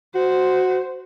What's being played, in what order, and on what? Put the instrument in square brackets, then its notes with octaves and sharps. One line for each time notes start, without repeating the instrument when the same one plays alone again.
[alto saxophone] F#4 [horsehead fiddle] C5